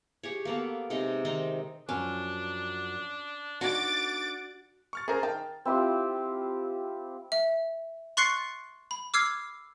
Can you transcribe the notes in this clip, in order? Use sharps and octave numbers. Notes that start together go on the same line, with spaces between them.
G4 G#4 C#5
A#3 B3 A4
C3 G#3 D#4
D#3 C4 D#4
F#2 F3 F#3 C#4 D4
D4 D#4 F#4 F#5 D6 A6 D7
C#6 F6 A6
C#4 G#4 A#4 C5 A#5
D#3 G5 A5
C4 E4 F4 G4
E5
C6 C#6 F#6 A6 C7 C#7
B5
D6 E6 F6 G#6 C7